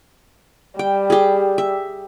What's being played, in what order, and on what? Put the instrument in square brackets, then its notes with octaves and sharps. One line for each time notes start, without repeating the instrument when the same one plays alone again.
[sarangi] G3 [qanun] G5
[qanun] G4 G#4
E5